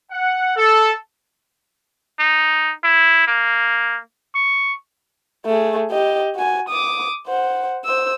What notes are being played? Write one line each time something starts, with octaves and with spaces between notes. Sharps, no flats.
F#5
A4
D#4
E4
A#3
C#6
A3 G#4
G4 D#5
F#4 G#5
D6 D#6
C5 F#5
C5 E6